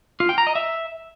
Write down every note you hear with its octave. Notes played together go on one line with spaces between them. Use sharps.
F4
G5
A#5
D#5
E5